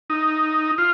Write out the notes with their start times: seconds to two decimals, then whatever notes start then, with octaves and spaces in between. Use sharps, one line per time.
0.10 D#4
0.78 F4